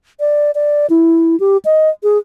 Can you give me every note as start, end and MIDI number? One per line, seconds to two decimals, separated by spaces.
0.20 0.51 74
0.55 0.87 74
0.90 1.38 64
1.40 1.57 67
1.65 1.90 75
2.03 2.18 68